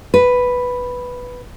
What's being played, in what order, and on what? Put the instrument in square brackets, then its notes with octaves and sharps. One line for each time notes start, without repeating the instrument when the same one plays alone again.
[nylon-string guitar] B4